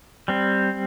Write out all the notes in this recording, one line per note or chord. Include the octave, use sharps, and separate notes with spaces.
G3 C4